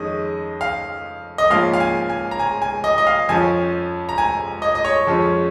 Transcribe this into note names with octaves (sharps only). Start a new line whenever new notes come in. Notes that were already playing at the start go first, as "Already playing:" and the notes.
Already playing: F2 D#3 G#3 C#4 D#5
F5
D#5
G#2 F3 A#3 C#4 F5
F5
G#5
G#5
A#5
G#5
G#5
D#5
D#5
F5
F2 F3 C#4 G#5
A#5
G#5
D#5
D#5
C#5
F2 F3 G#3 C#4